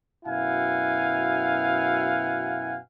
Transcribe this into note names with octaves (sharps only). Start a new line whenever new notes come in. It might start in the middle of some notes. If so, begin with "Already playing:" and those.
F#2 B2 E4 F5 F#5 G#5